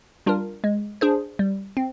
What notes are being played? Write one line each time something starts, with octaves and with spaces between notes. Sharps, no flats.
G3 D4 F4 A#4
G#3
D4 G#4 C5
G3
C4